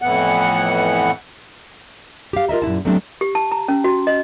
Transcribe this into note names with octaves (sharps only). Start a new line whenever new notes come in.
F2 A2 E3 B3 F#5
G4 F5
F4 A#4 D#5 E5
F#2 A#2 E4 A5
F#3 G3 A3 B3 C4 D4
G4
A5
A#5
C#4
F#4
D#5